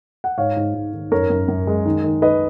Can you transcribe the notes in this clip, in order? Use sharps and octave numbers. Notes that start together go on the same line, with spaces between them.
F#5
G#2 C#5 F5
G#2
G#2
D#3
F#2 A#4 C#5
F#2
F#2
G#3
D#3
D#3
D#3 B4 D#5